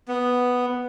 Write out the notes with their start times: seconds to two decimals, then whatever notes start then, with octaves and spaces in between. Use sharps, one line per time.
0.08 B3